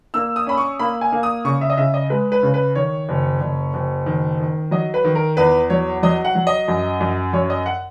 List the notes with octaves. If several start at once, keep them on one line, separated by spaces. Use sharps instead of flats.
A#3 E6
D#6
C#4 B5
C#6
A#3 B5
G#5
A#3
D#6
C#3 C#6
E5
D#5
C#3 E5
D#5
G#3 B4
B4
C#3
B4
D#3 C#5
F#1
F#1
F#1
D#3
D#3
F#3 D#5
B4
D#3
A#4
E2 B4
F#3 C#5
F#3 D#5
F#5
F#3
D#5
F#2
F#2
F#2 C#5
D#5
F#5